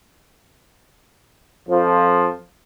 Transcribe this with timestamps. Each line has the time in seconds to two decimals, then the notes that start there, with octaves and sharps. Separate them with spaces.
1.69 F2 F3